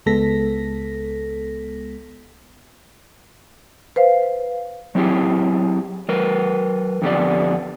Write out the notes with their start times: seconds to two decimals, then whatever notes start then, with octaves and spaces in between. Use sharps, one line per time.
0.06 C#2 G#3 B3 A4 A#6 B6
3.96 B4 C5 F5
4.95 F#3 C4 E4 G4 G#4
6.09 F#3 A#4 B4
7.02 F2 D3 B3 G4 D5